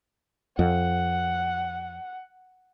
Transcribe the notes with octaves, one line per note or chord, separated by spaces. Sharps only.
F2 F#5